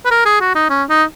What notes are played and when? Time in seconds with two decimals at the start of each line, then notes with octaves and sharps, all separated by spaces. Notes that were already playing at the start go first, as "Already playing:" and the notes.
0.05 B4
0.11 A#4
0.25 G#4
0.40 F#4
0.55 D#4
0.69 C#4
0.89 D#4